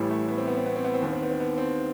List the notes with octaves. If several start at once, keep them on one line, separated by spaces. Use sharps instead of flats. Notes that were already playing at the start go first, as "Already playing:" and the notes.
Already playing: A1 A2 E3 G3
A3
B3
C4
B3
C4
B3
C4
B3
C4
D#2 D#3 B3
C4
B3
C4
B3
C4